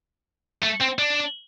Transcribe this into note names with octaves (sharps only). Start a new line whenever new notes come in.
A3
C4
D4